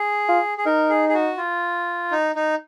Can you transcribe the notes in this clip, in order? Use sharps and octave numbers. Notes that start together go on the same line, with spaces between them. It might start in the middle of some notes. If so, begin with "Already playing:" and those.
Already playing: G#4
F4
G#4
D#4 A#4
G#4
G#4
F#4
F4
D#4
D#4